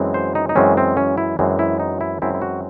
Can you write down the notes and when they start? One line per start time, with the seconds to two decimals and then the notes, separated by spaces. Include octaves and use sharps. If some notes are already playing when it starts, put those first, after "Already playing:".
Already playing: F#2 E3 G#3 C4
0.14 C5
0.35 D#4
0.49 D#4
0.56 F#2 E3 G#3 C4 C#4
0.77 C4
0.97 C#4
1.18 E4
1.39 F#2 E3 G#3 C4
1.59 E4
1.80 D#4
2.01 E4
2.22 F#2 E3 G#3 C4 E4
2.34 E4
2.42 F#4